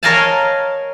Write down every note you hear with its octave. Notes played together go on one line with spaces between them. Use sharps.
A#4 C#5 D#5 F5 G#5 A5